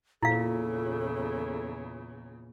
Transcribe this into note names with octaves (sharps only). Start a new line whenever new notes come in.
E2 A#2 C#3 E4 A4 F5